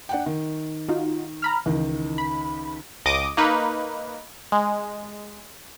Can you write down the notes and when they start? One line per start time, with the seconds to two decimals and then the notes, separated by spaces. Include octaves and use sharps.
0.09 D4 F#5 G5
0.26 D#3
0.88 D#4 F4 F#4
1.42 A#5 B5 F6
1.66 C#2 D#3 E3
2.18 B5
3.05 C#2 D#5 D6 D#6
3.37 A#3 D#4 B4
4.52 G#3